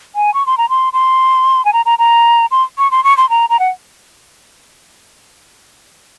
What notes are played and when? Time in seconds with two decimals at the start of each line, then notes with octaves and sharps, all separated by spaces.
0.15 G#5
0.34 C#6
0.46 C6
0.58 A#5
0.69 C6
0.93 C6
1.65 G#5
1.73 A#5
1.86 A#5
1.99 A#5
2.51 C6
2.78 C#6
2.91 C6
3.04 C#6
3.17 C6
3.30 A#5
3.50 A#5
3.60 F#5